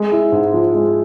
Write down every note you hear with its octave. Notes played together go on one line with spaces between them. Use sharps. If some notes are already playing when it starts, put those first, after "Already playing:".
Already playing: G#3
E4
G#2
F3
G#3